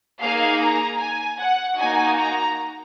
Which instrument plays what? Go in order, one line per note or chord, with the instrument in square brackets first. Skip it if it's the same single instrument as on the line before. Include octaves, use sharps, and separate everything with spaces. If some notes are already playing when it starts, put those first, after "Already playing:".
[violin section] A#3 D#4 G#4 F5
A#5
G#5
F#5
A#3 D#4 F#4 G#5
A#5